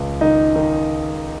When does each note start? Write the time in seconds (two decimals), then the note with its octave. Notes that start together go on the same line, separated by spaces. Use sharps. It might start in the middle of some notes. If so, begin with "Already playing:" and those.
Already playing: C#2
0.21 D#3 D#4
0.56 D#3